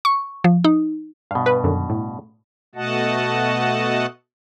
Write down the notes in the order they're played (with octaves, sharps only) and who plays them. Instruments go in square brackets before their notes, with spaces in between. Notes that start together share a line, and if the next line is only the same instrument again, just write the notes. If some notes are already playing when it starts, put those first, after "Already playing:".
[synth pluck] C#6
F3
D#4
[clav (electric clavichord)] G2 B2 [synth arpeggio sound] F5
[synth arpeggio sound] B4
F#2 D3 D#3
A2
[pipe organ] B2 A3 F#4 D#5 F#5 A5